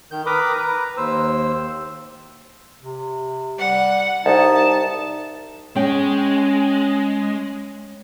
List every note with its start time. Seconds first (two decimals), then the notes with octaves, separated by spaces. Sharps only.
0.11 D#3 G6
0.26 A#4 B4 A#5 B5 D6 D#6
0.58 B4 A#5
0.97 D#2 C5 E6
2.82 C3
3.59 G3 F#5
4.26 C2 D#4 A5
5.76 G#3 C#4 G5